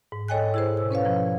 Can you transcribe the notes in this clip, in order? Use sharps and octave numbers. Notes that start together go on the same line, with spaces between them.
G#2
A4 C#5 D#5 G5 G#5 F#6
E4 G#4 C5
B2 E6
C#4 B4 C#5 F5
F3